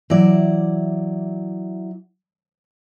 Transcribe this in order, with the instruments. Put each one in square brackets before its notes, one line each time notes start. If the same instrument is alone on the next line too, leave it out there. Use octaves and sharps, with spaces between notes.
[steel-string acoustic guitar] E3 F#3 E4 D5